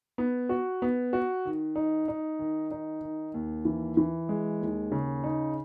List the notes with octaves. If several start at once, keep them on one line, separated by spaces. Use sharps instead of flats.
B3
F#4
B3
F#4
D#3
D#4
D#4
D#3
D#4
D#3
D#2
E3
E3
G#3
D#2
C#3
D#4